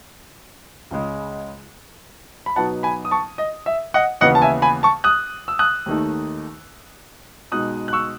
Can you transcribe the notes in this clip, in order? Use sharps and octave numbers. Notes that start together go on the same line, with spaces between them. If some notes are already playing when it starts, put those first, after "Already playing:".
C#2 C#3 G#3
B5
B2 F#3 B3 D#4 F#5 A5
G#5 B5
D#6
A5 C#6
D#5
E5
D#5 F#5
D#2 C#3 E3 B3 D#5 F#5
A5
E5 G#5
G#5 B5
A5 C#6
D#6 F#6
E6
D#6 F#6
D#2 D#3 A3 D#4
B2 G#3 D#4 D#6 F#6
F#6
C#6 E6